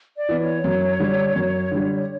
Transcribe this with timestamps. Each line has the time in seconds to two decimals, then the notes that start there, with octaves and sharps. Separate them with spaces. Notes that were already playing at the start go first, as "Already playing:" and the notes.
0.16 D5
0.29 E3 B3
0.40 C#5
0.64 F#2
1.00 D3 G3 D4
1.36 F#2
1.71 D3 G3 D4